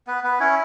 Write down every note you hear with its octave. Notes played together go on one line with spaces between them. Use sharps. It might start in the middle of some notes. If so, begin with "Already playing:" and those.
B3 B4
B3 B4
C#4 E4 C#5